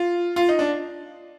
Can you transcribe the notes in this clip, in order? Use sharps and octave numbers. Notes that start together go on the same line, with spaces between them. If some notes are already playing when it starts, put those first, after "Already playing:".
Already playing: F4
F4
D#4
D4